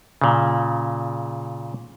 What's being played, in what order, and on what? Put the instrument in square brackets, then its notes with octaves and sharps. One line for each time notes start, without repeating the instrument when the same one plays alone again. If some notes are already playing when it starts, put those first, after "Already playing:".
[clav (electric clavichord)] A#2 C#3